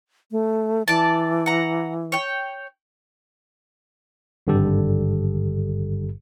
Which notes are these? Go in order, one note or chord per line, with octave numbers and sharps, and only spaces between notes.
A3
E3 D5 A5
F#5 A#5
C#5 G5
G#1 G2 D3 G3 G4 A4